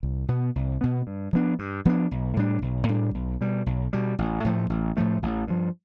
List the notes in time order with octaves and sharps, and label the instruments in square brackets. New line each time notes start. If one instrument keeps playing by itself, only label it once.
[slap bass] C2
B2 B3
C2
B2 B3
G2
F3 B3 D4
G2
F3 B3 D4
B1
A2 G3 D4
B1
A2 G3 D4
B1
B2 G3
B1
B2 G3
A1
A2 F3 A3
A1
A2 F3 A3
A1
G2 F3